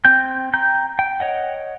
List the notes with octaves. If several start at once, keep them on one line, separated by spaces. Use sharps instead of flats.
C4 G5 G6
G5 A#5 G6
G5
C#5 D#5 F#5